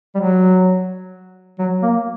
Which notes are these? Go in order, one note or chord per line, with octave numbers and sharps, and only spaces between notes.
G3
F#3
F#3
A#3